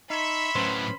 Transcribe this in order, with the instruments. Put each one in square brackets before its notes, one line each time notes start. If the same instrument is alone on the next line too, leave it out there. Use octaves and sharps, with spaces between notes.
[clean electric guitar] D#4 [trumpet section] C#5 E5 [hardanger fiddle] B5 C6
[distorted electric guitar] A2 F#3 [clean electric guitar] C#4 B4 C5